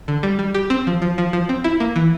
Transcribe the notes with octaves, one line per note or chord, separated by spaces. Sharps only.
D3
G3
G3
G4
C4
F3
F3
F3
F3
C4
E4
A#3
E3